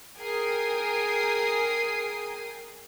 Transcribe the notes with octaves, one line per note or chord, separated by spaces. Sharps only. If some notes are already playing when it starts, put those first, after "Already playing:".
G#4 A#4 G5 G#5 D#6 C7